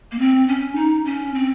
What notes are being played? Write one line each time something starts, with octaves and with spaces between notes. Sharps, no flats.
A#3
C4
C#4
D#4
C#4
C4